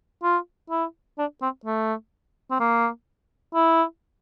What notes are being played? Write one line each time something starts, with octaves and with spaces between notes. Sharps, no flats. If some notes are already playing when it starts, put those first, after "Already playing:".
F4
E4
D4
C4
A3
C4
A#3
E4